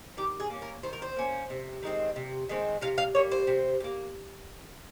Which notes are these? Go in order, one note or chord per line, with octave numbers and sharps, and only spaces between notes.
D#3 G4
G#4
A#3 C#4
A#4
D#3 C5
A#4
C5
A#3 C#4
C3
D#3 G#3 C4
C3
D#3 G#3 C4
C3 F5
F5
G3 A#3 C#5
C5
C3
G3
A#3